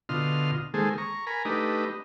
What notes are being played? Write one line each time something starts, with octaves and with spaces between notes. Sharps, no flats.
B2 D3 F4 D#5 C6 F6
D#3 G#3 A#3 G#4 A4 C5
A#5 C#6
A#4 G#5 A#5 B5
A3 D4 D#4 G4 B4 D#5